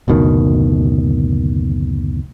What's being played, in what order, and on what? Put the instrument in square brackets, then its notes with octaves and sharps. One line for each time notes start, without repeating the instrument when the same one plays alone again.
[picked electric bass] F#1 D2 B2 D#3